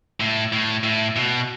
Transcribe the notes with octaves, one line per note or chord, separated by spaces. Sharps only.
A2
A2
A2
B2